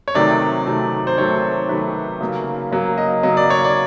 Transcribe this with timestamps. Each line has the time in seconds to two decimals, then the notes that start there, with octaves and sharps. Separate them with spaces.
0.08 C#5
0.14 C3 D#3 F#3 A3 D5
0.66 C3 D#3 F#3 A3
1.07 C5
1.17 C3 D#3 F#3 A3 C#5
1.69 C3 D#3 F#3 A3 B4
2.21 C#3 F#3 A#3
2.71 C#3 F#3 A#3
2.98 D#5
3.23 C#3 F#3 A#3 D#5
3.37 D5
3.50 C#5
3.64 D5